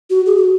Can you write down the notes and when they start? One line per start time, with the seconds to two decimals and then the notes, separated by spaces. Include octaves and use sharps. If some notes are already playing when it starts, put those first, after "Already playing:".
0.10 F#4
0.26 G#4
0.37 F#4